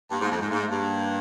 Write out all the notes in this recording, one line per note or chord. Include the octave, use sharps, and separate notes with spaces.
G2 A#3
G#2
A#3
F2
G#2 G#3
G#2 A#3
G#3
G2 A#3